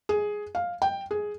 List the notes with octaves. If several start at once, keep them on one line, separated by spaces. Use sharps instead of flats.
G#4
F5
G5
G#4